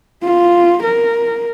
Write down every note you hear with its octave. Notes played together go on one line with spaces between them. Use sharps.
F4
A#4